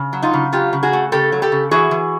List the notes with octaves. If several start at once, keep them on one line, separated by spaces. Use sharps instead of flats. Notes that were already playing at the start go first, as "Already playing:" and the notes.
Already playing: C#3
F#3
D#4 F4
C#3
F#3 F4 G4
C#3
F#4 G#4
A3
C#3 G4 A4
F#3
G4 A4
C#3
E3 F#4 G#4
E3